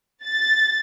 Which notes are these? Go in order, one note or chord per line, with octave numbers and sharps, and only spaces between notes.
A6